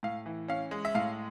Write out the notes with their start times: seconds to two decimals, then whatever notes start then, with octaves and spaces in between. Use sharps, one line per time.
0.03 A2 F5
0.26 E3
0.48 C#4 F5
0.71 G#3
0.85 E5
0.95 A2 F5